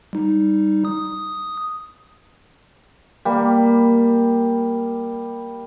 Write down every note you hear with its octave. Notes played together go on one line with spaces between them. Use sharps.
G3 D#4
D#6
G3 A#3